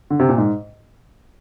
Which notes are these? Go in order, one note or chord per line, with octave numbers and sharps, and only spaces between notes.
D3
C3
A#2
G#2